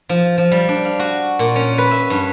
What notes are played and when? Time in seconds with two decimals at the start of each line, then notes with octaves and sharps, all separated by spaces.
0.09 F3
0.38 F3
0.52 G3
0.69 D4
0.85 F5
0.99 F#4
1.39 A#2
1.56 C#4
1.78 B4
1.91 E5
2.10 G2